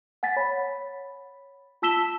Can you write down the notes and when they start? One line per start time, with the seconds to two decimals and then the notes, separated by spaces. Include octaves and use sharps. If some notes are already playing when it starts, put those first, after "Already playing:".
0.23 F#5 G#5 A6 B6
0.36 C#5 B5
1.82 F4 A5 E6 B6 E7 G7